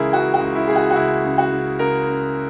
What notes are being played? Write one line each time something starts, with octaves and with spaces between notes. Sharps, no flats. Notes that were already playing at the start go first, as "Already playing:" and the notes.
Already playing: C#2 C#3 E3 E4 G#4 A#4
C#2 F#4
F#4
C#2
E4
C#2 G#4
F#4
F#4
C#2 E4
C#3
F#4
C#3
C#3 A#4
C#3